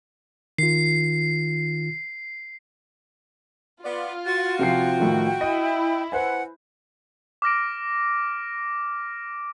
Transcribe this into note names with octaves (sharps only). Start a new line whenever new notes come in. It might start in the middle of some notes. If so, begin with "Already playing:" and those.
D#3 F4 C7
B3 F4 D5
F#4 A6
C3 F3 G5 C7
A2 D#3 F3
E4 D#5
B4 C5 F#5 G#5
D6 F6 A#6 D7